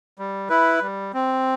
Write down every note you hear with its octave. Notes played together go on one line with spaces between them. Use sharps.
G3
E4 B4
G3
C4